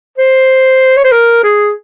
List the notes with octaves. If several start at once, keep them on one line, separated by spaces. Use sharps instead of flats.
C5
C#5
C5
A#4
G#4